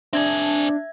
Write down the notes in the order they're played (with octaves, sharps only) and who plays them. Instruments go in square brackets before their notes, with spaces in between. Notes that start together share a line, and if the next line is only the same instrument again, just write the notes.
[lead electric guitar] C4 G#4 [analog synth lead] D4 [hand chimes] E5 G#6